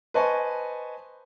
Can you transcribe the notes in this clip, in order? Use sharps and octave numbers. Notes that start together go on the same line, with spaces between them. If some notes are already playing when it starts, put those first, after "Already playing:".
B4 C5 D#5 G#5 A5 C#6